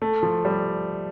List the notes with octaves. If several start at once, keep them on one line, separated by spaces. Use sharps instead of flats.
A3
F3
G3